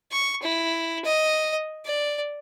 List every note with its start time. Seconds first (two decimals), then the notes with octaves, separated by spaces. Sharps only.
0.12 C#6
0.42 E4
1.05 D#5
1.85 D5